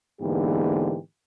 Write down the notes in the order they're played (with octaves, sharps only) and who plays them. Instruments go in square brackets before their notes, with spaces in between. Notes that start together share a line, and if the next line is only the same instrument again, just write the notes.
[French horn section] G#2 D3 E3 A#3 B3 G4